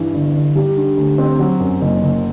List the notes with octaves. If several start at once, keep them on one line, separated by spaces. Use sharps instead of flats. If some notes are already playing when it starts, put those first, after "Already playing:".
Already playing: G2 E3
G1
G1
G3
D3
D2
C4
F#3
F#2
F#1
F#1